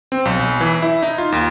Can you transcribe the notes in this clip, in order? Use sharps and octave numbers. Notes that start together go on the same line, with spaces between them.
C4
B1
B1
E3
E4
D#4
F4
D#2